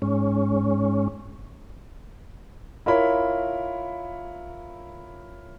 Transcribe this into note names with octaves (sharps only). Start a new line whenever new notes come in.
G#2 C#4
E4 F4 A#4 C#5 B5